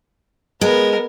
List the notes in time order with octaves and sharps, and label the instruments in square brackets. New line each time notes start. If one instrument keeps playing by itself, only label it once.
[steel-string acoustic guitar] G#3 [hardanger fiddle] B3 A#4